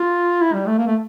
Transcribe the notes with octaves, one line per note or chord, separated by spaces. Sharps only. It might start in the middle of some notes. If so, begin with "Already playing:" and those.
Already playing: F4
E4
G3
A3
A#3
A3